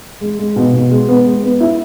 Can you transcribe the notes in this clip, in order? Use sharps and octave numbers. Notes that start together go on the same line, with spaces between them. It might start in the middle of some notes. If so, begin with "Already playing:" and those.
G#3
G#3
B2
B2
G#3
B3
G#3
B3
E4